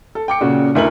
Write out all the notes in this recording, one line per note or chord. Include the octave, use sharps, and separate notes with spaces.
A4
G5 D6 C#7
A#2 C#3 F#4
D2 E4 A#4 F#7